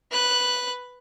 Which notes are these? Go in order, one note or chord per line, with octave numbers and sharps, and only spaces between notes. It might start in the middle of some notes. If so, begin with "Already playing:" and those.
B4 F#6